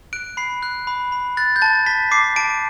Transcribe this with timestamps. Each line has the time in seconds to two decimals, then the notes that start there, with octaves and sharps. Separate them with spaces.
0.13 F#6 D7
0.37 B5 C7
0.63 F#6
0.87 B5
1.12 B5
1.37 F#6 A6
1.56 G6
1.61 A5 A6
1.86 A5 B6
2.11 D6 C7
2.36 A5 D7